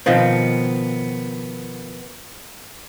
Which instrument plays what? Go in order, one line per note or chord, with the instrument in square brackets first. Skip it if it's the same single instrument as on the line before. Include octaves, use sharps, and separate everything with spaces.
[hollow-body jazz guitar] B2 D#3 F3 B3 C4